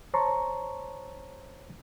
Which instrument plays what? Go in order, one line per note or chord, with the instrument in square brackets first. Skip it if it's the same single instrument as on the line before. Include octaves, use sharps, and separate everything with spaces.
[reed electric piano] C5 C#5 A5 A#5 C6 C#6